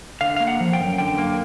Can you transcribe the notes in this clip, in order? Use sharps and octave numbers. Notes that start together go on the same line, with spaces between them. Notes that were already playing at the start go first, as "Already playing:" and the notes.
D3 F5
A#3 F5
F#5
F3
G5
F#2
D3 G5
A#3